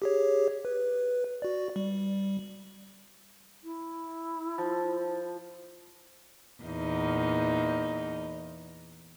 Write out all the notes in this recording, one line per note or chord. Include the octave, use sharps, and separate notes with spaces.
G4 G#4 C#5
B4
F#4 D5
G3
E4
F3
E2 A#2 D#4